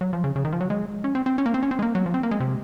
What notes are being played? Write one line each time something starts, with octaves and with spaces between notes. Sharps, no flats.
F#3
F3
C#3
C#3
D#3
F3
F#3
G#3
C#4
C4
C4
C#4
A#3
C4
C#4
C4
G#3
A#3
F#3
F3
C4
A#3
G#3
C3